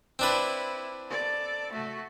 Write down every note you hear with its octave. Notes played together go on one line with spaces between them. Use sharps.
C4 D4 E4 B4
A4 D5
A3 F#4